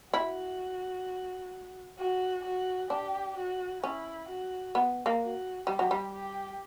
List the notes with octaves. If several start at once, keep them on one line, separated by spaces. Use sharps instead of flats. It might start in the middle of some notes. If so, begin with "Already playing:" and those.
E4 F#4
F#4
F#4
D4 G4
F#4
C#4 E4
F#4
B3
A#3
F#4
G3 G4
F#3
G3
G4